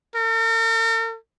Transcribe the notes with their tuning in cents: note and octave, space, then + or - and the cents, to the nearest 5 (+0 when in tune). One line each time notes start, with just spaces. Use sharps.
A#4 -45